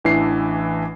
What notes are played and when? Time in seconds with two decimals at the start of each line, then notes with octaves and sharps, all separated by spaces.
0.05 A1 E3 D4 E4 C7